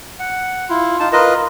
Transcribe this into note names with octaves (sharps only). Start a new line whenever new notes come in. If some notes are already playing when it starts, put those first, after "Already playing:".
F#5
E4 F4
D#4 F4 A5
F4 A#4 B4 D#5